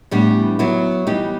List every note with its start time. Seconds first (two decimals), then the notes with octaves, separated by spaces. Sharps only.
0.11 A2 E3 G3 B3 D4
0.59 F#3 B3 E4
1.07 E3 G3 B3 D#4 G4